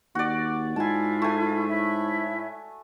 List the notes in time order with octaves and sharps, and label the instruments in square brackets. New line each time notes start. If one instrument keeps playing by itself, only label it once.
[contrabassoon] D#2 [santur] F#4 D5
[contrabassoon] G#2 [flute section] E4 F4 [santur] G#5 A5
[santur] A3 G#5
[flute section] E4 C#5 E5